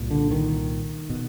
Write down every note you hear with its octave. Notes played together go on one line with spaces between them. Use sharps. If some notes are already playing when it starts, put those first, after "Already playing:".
Already playing: C2 A#2
D3
D#3
B2